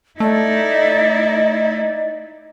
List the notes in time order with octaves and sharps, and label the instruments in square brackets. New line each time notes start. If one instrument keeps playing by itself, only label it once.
[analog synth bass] A3 [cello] D#4 E4 [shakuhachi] D5 [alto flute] D#5